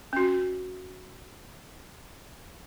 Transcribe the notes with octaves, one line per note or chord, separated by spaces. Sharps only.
C#4 F#4